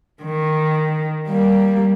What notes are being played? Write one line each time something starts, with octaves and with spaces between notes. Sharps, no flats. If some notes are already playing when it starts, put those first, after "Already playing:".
D#3
G3 A#3